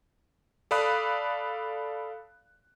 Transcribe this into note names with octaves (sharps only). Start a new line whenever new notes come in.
A4 D5 F5 B5 D#6 F#6